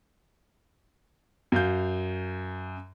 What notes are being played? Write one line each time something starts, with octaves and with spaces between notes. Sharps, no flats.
F#2 F5 G6